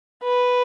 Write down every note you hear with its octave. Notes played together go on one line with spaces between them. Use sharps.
B4